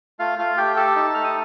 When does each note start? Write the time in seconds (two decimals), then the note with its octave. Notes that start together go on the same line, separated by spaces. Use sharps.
0.19 A3 F4 F5
0.38 A3 F4 F5
0.57 A3 G4 G5
0.77 G4 A4 A5
0.96 D#4
1.14 A3 F6
1.24 D#6